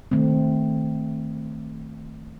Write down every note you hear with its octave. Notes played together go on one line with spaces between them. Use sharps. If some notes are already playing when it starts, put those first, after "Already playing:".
D#3 A3 C4